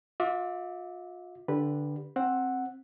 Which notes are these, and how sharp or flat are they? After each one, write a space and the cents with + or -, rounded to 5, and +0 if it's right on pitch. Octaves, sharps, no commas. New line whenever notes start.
F4 +40 E5 -25 D6 +0
D3 +0 G4 +15 B4 -10
C4 +15 F#5 +0